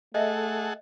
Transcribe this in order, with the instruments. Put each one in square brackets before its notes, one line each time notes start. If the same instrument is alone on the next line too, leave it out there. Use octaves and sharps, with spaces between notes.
[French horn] A3 [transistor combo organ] G#4 A4 F#5 [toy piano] D#5 E5